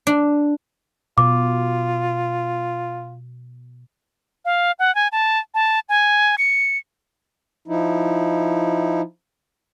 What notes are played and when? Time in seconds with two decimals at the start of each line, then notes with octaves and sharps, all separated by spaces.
0.07 D4
1.18 B2 F4 D6
4.45 F5
4.79 F#5
4.95 G#5
5.12 A5
5.55 A5
5.89 G#5
6.38 C#7
7.68 F3 D#4 E4